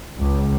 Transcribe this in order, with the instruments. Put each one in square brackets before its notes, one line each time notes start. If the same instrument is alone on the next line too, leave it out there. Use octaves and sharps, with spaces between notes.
[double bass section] C#2